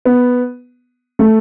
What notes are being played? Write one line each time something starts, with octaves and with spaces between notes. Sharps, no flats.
B3
A3